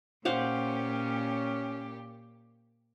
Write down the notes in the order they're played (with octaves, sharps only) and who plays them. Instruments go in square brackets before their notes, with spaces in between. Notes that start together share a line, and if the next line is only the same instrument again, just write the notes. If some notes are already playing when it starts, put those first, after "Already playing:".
[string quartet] A#2 G4 [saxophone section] C#4 [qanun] C5 F5 F#5